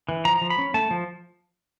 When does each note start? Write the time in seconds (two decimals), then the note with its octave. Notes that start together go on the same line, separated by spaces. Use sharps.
0.09 E3
0.25 F3 A#5
0.42 F3
0.50 B5
0.58 C#4
0.74 A3 A5
0.91 F3